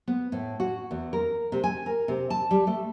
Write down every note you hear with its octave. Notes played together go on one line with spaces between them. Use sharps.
B3
A2
F#4
E2
A#4
C3
G#5
A#4
C3
A5
G3
A3